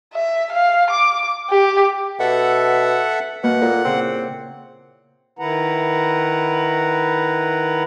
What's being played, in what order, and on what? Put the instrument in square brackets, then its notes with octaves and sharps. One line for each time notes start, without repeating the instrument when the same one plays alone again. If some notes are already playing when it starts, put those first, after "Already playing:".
[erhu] E5
F5
D6
G4
[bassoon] B2 [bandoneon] A4 E5 F#5
[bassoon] B2 [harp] A#3 [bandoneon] F#5
[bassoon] A#2 [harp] A4
[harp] A#2 C#3 E4 [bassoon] C4
[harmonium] D#3 E4 B4 F#5 A#5